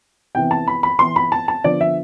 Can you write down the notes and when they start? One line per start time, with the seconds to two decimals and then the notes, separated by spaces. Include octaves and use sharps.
0.35 C3 E3 B3 G5
0.51 A5
0.68 B5
0.83 B5
0.99 E3 B3 C6
1.16 B5
1.32 A5
1.48 A5
1.64 D3 F3 B3 D5
1.81 E5